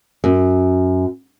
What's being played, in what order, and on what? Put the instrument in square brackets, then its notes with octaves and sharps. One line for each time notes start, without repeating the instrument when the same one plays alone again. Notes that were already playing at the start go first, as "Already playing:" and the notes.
[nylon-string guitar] F#2